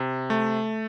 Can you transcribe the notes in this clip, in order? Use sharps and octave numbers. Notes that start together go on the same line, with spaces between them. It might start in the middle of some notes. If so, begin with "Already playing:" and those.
Already playing: C3
A3